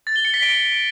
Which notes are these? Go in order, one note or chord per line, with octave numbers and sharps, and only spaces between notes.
A6
G7
C#7
B6
D7